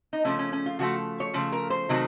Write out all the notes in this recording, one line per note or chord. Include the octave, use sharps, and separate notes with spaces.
D#4
C#3 F3 A3 C#4
C#4
C#4
F4
C#3 F3 A3 F#4
C#5
C#3 F3 A3
A#4
C5
C3 D#3 F#3 A3